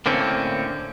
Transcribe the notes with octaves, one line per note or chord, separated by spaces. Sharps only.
A2 D3 A#3 C4 C#4